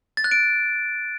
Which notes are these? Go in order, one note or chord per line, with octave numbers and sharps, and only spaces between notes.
A6
F#6
D7